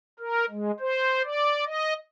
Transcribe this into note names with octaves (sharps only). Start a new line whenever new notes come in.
A#4
G#3
C5
D5
D#5